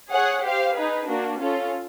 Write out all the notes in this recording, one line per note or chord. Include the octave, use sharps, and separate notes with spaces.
G#4 C#5 F#5
G4 C5 F5
D#4 G#4 B4
A#3 D4 F#4
C#4 F4 A4